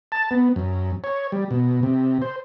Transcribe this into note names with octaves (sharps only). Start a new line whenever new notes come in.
A5
B3
F#2
C#5
G3
B2
C3
C5